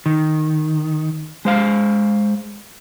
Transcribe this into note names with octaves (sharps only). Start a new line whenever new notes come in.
D#3
G#3 C5 F5